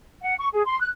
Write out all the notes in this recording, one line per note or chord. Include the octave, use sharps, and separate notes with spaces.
F#5
C#6
G#4
C6
F#6